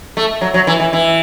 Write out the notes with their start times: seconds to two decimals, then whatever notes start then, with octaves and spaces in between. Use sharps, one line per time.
0.17 A3
0.41 F#3
0.54 F#3
0.67 E3
0.80 E3
0.93 E3